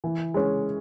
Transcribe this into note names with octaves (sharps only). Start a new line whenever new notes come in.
E3
G#3 C#4